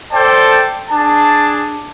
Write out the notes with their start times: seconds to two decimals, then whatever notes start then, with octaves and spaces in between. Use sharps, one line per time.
0.12 A4 C5 D5 G5 A5
0.90 D4 G#4 A5